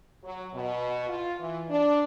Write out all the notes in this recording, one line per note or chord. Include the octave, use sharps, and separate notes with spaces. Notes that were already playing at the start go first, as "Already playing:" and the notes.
F#3
B2
F4
E3
D4